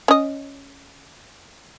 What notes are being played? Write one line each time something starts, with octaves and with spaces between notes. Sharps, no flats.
C#4 D#5